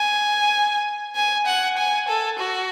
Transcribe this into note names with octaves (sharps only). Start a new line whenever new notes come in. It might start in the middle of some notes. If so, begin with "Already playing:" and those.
Already playing: G#5
G#5
F#5
G#5
A4
F#4